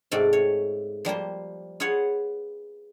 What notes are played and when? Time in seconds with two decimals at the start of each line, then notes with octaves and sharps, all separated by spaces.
0.11 G#2 C3 A3 D5
0.33 C#5
1.05 F3 G3 A#3 C5
1.80 F4 G#4 B4 C#5 F#5